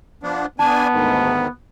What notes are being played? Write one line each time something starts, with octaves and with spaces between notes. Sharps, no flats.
F3 B3 D4
B3 D4 G#5 A5
D2 G#2 D#3